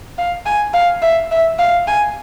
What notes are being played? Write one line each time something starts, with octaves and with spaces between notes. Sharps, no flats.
F5
G#5
F5
E5
E5
F5
G#5